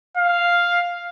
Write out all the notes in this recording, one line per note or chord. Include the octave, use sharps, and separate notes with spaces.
F5